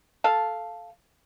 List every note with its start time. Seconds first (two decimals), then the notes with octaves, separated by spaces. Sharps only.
0.24 A4 F5